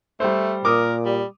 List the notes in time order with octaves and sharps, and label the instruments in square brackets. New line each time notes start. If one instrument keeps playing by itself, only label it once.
[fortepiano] G3 C5 [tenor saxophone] A3
[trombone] A#2 [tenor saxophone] A#4 [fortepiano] D6 D#6
[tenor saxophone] G3